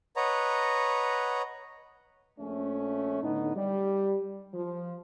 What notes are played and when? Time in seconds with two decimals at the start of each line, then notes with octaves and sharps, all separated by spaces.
0.16 B4 C#5 D#5 F#5 A#5
2.38 A#1 A3 C#4
3.23 A2 D3 B3 D#4
3.55 G3
4.53 F3